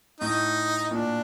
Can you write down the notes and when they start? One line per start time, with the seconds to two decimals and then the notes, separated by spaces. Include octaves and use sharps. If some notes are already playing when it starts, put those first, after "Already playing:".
0.21 A2 D#4
0.91 A#2 D4